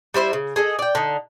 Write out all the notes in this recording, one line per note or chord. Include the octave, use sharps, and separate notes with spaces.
G3 E4 C5 E5
C#3
G#4 A4 D#5
D5 G5
D3 D#4